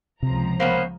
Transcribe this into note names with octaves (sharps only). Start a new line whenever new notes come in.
C#2 C3 F3 A#5
A#3 B3 C#4 C5